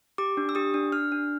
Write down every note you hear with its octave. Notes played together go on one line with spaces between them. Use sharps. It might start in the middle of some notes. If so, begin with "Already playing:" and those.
G4 D6
D4
E6
G4 D#6
D4
D4 F6
D4